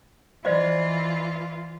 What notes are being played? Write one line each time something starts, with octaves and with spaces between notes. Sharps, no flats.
E3 F4 C5 D5 D#5